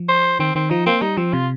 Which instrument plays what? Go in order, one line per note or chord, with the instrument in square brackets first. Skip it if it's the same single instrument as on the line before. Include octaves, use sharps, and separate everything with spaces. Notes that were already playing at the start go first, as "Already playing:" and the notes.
Already playing: [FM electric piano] F3
[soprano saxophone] C5
[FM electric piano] D#3 [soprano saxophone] C4
[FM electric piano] D#3 [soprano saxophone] C4
[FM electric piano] F3 [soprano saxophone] D#4
[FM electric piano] A#3 [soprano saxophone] C4
[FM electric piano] G3 [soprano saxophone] D#4
[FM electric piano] F3 [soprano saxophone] C4
[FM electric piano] C3 [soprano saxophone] F4